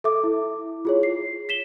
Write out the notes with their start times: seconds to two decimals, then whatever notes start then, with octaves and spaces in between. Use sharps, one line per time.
0.04 A4 E5 D6
0.24 E4
0.85 F4 G#4 C#5
1.03 C7
1.49 B6 E7 G7